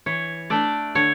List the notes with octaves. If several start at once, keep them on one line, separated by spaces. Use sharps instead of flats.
E3 C#5
A3 D4 D5
D3 C#5